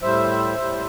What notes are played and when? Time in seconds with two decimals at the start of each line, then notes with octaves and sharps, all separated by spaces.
0.02 A2 G3 C5 E5
0.58 A2 G3